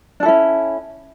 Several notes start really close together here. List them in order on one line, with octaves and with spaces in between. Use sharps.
D4 A4 E4 C#4